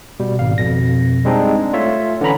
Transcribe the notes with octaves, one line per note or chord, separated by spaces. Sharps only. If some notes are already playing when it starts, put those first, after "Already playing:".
B2 G3
G#1 F5
F2 B2 A#6
G3 G#3 C4 D4 D#4
A3 F4 C#5 E5
D3 E3 C#4 A#5 B5